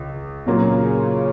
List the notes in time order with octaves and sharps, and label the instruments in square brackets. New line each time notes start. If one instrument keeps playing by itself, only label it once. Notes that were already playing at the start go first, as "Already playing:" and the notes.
Already playing: [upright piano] C#2
[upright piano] A#2 F#3 A#3 F4 [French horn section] C#3